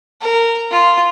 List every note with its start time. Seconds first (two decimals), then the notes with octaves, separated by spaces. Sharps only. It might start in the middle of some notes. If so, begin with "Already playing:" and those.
0.22 A#4
0.71 F4